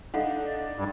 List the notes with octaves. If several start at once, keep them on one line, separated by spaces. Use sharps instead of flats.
D4 D#4 A4 F5 F#5
D5
G2